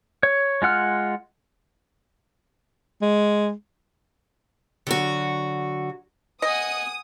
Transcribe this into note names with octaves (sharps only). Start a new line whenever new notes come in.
C#5
G#3 F4 F#5 F6
G#3
D3 F#3 F#4
D#5 F#5 G#5 D#6